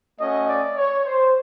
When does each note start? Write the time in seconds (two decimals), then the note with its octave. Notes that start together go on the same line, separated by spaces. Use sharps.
0.20 A3 C#4 F#4 D#5
0.48 D5
0.77 C#5
1.05 C5